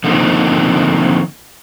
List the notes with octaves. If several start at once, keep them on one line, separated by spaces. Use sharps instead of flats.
D3 F3 A#3 C4 D#4